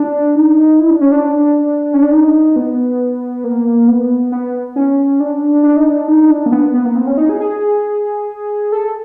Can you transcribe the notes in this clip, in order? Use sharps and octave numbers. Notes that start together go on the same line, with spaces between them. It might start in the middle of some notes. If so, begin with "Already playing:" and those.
Already playing: D4
D#4
E4
D4
C#4
D4
C#4
D4
D#4
B3
A#3
B3
B3
C#4
D4
D4
D#4
D4
D#4
D4
A#3
B3
B3
A#3
C4
C#4
D#4
G#4
G#4
A4